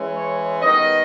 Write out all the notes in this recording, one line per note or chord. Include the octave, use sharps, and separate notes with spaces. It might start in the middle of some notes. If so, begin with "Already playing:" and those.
Already playing: E3 G#3 C#4
C#5
D#3 G3 B3 D#5